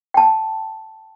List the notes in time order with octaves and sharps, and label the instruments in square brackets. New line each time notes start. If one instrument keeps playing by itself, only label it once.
[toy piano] G5 A5